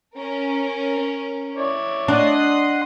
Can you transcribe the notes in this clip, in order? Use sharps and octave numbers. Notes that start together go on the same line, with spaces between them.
C#4 A#4
E4 C#5 D5
D4 D#5 F#5 C6 D#6